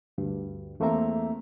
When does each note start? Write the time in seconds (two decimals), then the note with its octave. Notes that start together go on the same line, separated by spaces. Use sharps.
0.18 D2 G2
0.80 E2 A3 A#3 C4 E5 A#5